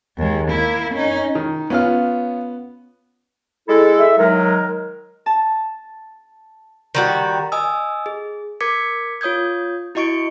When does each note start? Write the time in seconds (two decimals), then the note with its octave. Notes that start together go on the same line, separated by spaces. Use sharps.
0.18 D#2 G#3
0.49 A#3 E4
0.94 C#4 D#4
1.35 D#3
1.70 B3 C#4 F4 F6
3.69 G#3 E4 A4
3.99 E5
4.18 D#3 F#3 G#3 A#4
5.26 A5
6.95 D#3 G3 F#4
7.52 D#5 G#5 D#6 E6
8.06 G#4
8.61 A#4 D6 G#6 B6 C#7
9.21 F4 C#5 D#6 G6 G#6
9.95 E4 F#4 D#5 C#6 C#7 D7